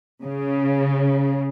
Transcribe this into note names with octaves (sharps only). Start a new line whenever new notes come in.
C#3